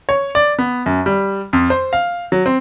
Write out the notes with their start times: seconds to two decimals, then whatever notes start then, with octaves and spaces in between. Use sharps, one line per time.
0.09 C#5
0.35 D5
0.59 B3
0.86 F#2
1.06 G3
1.53 F2
1.70 C5
1.93 F5
2.32 F#3
2.46 C4